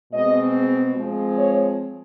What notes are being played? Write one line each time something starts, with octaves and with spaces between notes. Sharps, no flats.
B2 G#3 C4 D#5
F3 G#3 C4
C#5